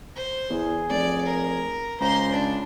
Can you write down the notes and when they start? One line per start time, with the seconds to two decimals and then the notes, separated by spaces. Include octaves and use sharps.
0.16 C5
0.50 E2 G#4
0.89 F1 D5
1.26 A#4
2.00 C#2 C5 A#5 C6
2.32 D4 A5